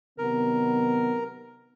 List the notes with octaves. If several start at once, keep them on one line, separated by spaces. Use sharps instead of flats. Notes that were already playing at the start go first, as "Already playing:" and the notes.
C3 D#3 F#3 B3 A#4